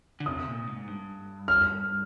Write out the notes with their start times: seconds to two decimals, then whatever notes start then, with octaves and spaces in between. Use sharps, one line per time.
0.20 D3
0.26 C3 D#6
0.47 A#2
0.67 G#2
0.87 G2
1.48 F6